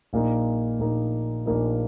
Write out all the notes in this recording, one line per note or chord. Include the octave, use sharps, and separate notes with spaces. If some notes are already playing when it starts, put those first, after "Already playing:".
A#1 A#2 A#3 D#4
A#1 A#2 A#3 D#4
A#1 A#2 A#3 D#4